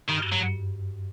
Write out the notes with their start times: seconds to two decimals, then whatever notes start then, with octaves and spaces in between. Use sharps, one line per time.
0.08 G2 D#3
0.20 F#2
0.32 G2 F#3